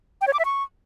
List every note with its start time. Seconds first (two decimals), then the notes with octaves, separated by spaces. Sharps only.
0.21 G5
0.27 C#5
0.33 D6
0.39 E5
0.45 C#6